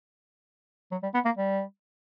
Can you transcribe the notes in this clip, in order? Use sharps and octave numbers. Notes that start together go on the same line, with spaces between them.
F#3
G3
B3
A#3
G3